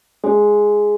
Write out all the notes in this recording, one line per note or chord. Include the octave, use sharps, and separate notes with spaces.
G#3